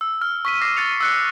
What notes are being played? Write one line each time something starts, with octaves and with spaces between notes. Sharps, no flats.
E6
F6
C#6 B6 D#7
D6 A#6 C7
F6 A6 C#7 F7
E6 F#6 C#7